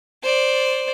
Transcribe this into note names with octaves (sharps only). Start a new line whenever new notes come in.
C5 D5